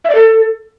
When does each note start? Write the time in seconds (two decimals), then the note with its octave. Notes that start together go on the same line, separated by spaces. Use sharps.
0.05 E5
0.10 D5
0.15 A4